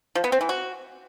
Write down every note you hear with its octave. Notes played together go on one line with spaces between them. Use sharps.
F3
B3
C4
E3
F#4